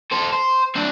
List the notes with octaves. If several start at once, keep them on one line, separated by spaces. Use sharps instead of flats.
A4 C5
C5
C4 D4